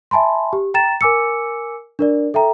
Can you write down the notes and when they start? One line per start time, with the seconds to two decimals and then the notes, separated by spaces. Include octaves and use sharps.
0.11 E5 G#5 A5 B5 C6
0.53 G4
0.74 G5 A#5 A6 E7
1.01 A#4 G#5 D6 E6 C#7
1.99 D4 A#4 D5
2.34 A4 E5 G5 A#5